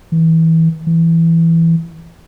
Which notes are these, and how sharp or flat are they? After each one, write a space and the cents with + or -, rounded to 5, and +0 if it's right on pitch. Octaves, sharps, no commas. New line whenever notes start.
E3 -25
E3 +5